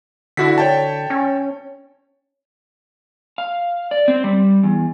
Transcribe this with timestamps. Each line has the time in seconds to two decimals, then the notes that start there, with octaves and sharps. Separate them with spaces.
0.37 D3 E4 F#4 B6
0.58 C#5 G5 A5
1.10 C#4
3.38 F5
3.91 D5
4.08 C4
4.24 G3
4.63 E2